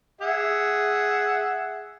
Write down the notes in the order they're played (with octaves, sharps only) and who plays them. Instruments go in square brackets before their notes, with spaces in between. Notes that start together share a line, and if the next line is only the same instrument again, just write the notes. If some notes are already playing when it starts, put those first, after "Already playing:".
[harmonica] G#4 E5 F#5